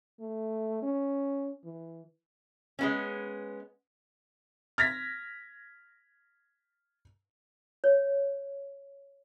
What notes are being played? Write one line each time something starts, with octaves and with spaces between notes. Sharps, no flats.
A3
C#4
E3
G#3 B3 C#4
F6 G#6 A#6 B6
C#5